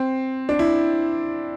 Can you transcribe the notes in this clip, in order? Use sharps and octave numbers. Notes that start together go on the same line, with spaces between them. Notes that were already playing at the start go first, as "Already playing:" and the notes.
Already playing: C4
D4
E4